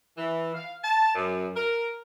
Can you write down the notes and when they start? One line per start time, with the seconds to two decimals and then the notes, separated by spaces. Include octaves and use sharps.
0.17 E3
0.54 F5
0.84 A5
1.15 F#2
1.55 A#4